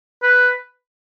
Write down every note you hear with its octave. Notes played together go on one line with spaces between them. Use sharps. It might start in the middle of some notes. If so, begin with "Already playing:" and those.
B4